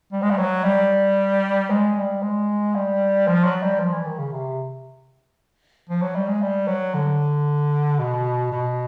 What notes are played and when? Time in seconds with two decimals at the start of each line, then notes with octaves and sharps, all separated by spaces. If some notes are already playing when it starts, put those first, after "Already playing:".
0.12 G3
0.22 G#3
0.30 G3
0.38 F#3
0.64 G3
1.70 G#3
1.96 G3
2.22 G#3
2.75 G3
3.28 F3
3.45 F#3
3.62 G3
3.80 F3
3.92 E3
4.05 D#3
4.19 C#3
4.32 C3
5.89 F3
6.02 F#3
6.16 G3
6.28 G#3
6.42 G3
6.68 F#3
6.94 D3
7.99 B2
8.52 B2